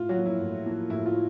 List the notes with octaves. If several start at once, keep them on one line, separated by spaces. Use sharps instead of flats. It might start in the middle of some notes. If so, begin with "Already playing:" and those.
Already playing: A2 F4
F#3 F#4
F3 A#3
E4
A2
F3 A#3
A2 E4
F4